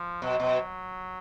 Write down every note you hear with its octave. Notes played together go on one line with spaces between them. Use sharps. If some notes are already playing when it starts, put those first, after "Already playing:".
Already playing: F3
B2 F#3
B2